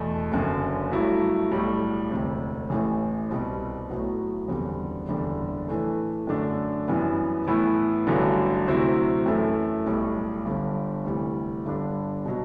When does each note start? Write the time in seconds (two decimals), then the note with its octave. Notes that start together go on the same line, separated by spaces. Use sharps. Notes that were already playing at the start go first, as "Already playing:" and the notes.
Already playing: E2 B2 A3
0.31 F#1 F#2 D3
0.91 G2 F#3 A3 E4
1.51 B1 A2 G3
2.11 E1 D2 C3
2.70 A1 A2 E3
3.30 C2 B2 G3 C4
3.89 B1 A2 F#3 B3 E4
4.48 F#1 E2 D3 G3 C4
5.09 F#1 E2 D3 G3 D4
5.68 A2 E3 A3
6.27 F#2 D3 A3 D4
6.88 F#2 E3 G3 B3
7.47 A2 E3 B3 E4
8.07 A1 G2 D3 F#3
8.67 D2 C3 F#3 C4 E4
9.26 F#2 E3 A3 E4
9.86 B1 A2 G3
10.45 G1 G2 D3
11.05 D2 C3 E3 G3
11.65 G1 G2 D3 G3 D4
12.25 B2 F#3